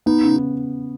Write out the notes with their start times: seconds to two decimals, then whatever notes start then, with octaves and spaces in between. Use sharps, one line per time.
0.06 B3 D#4
0.23 C#3